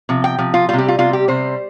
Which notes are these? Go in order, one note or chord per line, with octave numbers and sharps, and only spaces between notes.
C3 F3
G5
C3 F3
F4
C3 G3 F4
G4
F4
C3 G3 F4
G4
C3 G3 C5